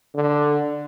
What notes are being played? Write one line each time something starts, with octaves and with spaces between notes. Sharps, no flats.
D3